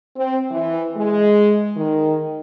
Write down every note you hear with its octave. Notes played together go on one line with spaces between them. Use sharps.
C4
E3
G#3
D#3